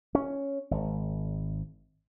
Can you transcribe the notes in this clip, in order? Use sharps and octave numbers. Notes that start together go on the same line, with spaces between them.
C#4
G#1